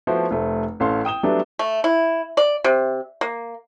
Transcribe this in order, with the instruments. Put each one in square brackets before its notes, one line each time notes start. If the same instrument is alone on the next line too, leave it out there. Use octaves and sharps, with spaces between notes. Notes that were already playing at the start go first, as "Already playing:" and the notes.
[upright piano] F3 A3 B3 E4 F#4 C5
F1 A3 C5
A1 C#4 A4 F5 C6
G5 D#6 E7 G7
F#3 G3 A3 B3 D4 E4
[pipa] A3
E4
D5
C3
A#3